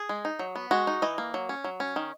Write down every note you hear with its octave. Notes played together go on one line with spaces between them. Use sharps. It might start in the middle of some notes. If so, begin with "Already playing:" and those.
Already playing: G#4
G#3
D#4
F#3
B3
G#3 F#4
D#4
E3 D#5
A#3
F#3
C#4
F#3
C#4
D#3